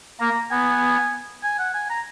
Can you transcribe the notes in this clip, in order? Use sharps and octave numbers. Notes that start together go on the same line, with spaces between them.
A#3 A#5
B3 G#5
G#5
F#5
G#5
A#5